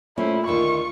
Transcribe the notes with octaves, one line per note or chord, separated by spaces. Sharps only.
A#2 A3 C#4 E4 C5
D2 D#3 F4 E5 C#6